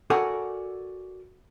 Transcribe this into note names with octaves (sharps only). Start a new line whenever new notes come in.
F#4 A4 A#4 D5 F#5 G#5